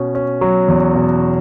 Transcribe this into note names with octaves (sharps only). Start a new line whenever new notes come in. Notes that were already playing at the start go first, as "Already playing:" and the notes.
Already playing: B2 C#4
C#4
F#3
E2
B2